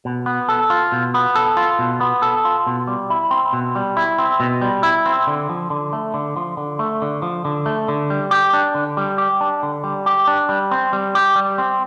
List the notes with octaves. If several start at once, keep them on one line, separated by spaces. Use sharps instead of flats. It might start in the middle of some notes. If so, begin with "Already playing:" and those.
B2
B3
A4
F4
B2
B3
A4
F4
B2
B3
A4
F4
B2
G3
E4
C4
B2
G3
E4
C4
B2
G3
E4
C4
D3
F3
D3
A3
D3
F3
D3
A3
D3
F3
D3
A3
D3
G3
G4
D4
D3
G3
G4
D4
D3
G3
G4
D4
G3
C4
G3
G4
G3
C4